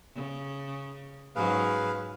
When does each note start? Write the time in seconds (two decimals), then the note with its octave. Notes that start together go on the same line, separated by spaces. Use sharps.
0.15 C#3
1.36 G#2 F#3 C#4 G#4 B4 F5